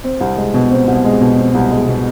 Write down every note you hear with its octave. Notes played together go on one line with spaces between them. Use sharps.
C4
C2
G#3
B2
C4
C2
G#3
B2
C4
C2
G#3
B2